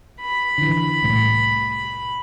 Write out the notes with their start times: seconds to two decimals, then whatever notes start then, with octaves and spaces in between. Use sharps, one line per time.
0.21 B5
0.58 D3 E3
1.02 C2 A2